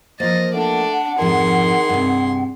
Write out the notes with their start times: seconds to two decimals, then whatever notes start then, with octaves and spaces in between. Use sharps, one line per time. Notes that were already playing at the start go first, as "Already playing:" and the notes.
0.20 F3 A#3 C5 D#5 A6
0.53 A3 D4 D5 F#5
1.19 F2 G#2 D#3 F3 G#4 C6
1.89 G2 C3